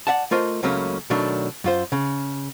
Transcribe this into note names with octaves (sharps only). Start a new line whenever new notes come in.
D5 E5 F#5 A5
A3 F4 A#4 C5 D#5
C#2 C#3 F#3 A3 A#3 C#4
B2 D#3 F#3 A3 D4
F#2 F4 C5
C#3